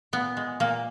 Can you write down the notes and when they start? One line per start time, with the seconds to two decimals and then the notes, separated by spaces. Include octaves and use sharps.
0.13 A#2 B3
0.37 G#3
0.60 A#2 A#3